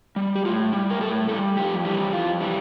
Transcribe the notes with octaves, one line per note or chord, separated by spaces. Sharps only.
G3
G4
A2 F4
G3
A#4
A2 A4
G3 A4
F2 G4
E3 G3
F2 F4
E3 G3